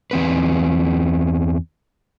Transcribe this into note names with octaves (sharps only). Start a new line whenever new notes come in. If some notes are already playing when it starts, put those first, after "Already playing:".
E2 C4 B4